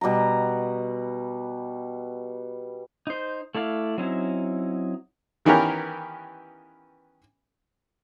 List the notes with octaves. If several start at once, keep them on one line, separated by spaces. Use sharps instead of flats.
B2 G3 F#5 A#5
D#4 C5
A3 E4 D5 F5
F#3 C4 C#4 D#4 E4
D#3 E3 B3 C#4 G4 A#4